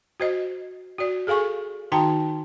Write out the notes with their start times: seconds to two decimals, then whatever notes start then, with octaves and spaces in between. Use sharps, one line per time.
0.20 F#4 C5 D#5
0.98 F#4 D5
1.27 G#4 A4 F5 G#5 C#6
1.92 D#3 D#4 F#4 G5 A5 A#5